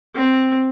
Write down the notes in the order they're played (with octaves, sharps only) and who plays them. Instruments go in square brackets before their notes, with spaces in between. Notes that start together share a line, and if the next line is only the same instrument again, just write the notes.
[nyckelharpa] C4